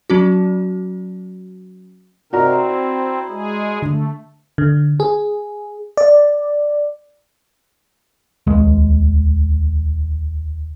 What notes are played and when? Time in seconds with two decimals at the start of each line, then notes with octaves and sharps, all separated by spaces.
0.10 F#3 C#4 F#4
2.33 C3 C4 D#4 F#4 A#4 D5 A#5
2.66 E4
3.29 G#3 G#4
3.82 D3 A3
4.58 D3
5.00 G#4
5.97 D5
8.47 D#1 C#2 G#3